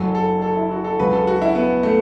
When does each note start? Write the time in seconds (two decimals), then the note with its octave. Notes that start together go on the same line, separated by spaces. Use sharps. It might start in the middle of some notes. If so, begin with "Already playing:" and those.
Already playing: F#1 F#2 F#3 A4
0.15 A4
0.42 A4
0.57 E4
0.71 F#4
0.84 A4
0.99 C#2 C#3 F#3 B4
1.13 A4
1.27 F#4
1.42 E4
1.55 B3
1.83 A3